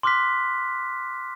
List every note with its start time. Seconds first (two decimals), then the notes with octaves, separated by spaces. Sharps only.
0.03 C6 D6 F6 F#6 B6